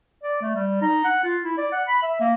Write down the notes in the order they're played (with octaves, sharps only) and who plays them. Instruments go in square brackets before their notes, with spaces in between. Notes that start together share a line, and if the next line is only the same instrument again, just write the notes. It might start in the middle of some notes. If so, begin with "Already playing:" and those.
[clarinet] D5
A3
G3
D#4
F#5
F4
E4
D5
F#5
B5
E5
A#3